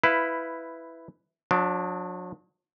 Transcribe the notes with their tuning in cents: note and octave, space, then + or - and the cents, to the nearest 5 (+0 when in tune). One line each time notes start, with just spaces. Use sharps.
E4 +0 B4 +10 F5 -5
F#3 -40 D4 +0